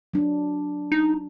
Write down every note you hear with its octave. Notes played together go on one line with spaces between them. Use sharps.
F#3 D4
D#4